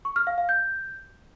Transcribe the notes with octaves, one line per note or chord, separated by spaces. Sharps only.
C#6
F6
F5
F5
G6